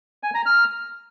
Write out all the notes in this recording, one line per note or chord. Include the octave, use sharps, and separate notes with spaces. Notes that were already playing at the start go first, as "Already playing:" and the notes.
G#5
A#5
F6